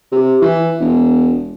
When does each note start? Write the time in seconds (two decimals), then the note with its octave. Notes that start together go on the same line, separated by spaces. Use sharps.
0.12 C3
0.42 E3
0.80 E1